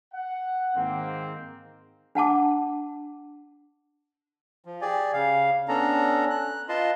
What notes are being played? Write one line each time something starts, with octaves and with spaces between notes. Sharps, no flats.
F#5
G#2 D#3 A#3 C4
D4 F#5 A5 D6
F3
G4 G#4 D5 G#5
C#3 F5
B3 C#4 D4 A4 A#5
F#6
F4 B4 D#5 A5 C6